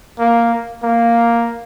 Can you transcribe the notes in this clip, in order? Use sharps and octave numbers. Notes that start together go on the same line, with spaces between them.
A#3
A#3